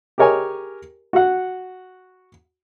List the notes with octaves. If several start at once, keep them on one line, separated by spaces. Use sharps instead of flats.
G4 G#4 A#4 C#5 D#5 G#5
F#4 F#5